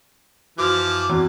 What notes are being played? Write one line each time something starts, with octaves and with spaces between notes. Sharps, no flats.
F#2 E3 F3 F#4 D6
E2 C4 F#4 F#6